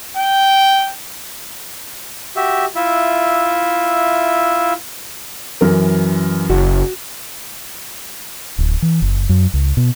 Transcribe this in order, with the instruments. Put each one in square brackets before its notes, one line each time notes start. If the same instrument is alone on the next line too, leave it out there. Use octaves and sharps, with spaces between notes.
[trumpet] G5
[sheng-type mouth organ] F#4 G4 E5
E4 F4 E5
[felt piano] F#2 E3 A#4
[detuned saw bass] F#1 [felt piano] F#4
[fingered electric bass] D1
E3
F#1
F#2
C#2
B2